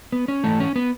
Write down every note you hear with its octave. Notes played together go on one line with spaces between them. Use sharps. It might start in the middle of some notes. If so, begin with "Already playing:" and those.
B3
C#4
G#2 E3 A3
C#4
B3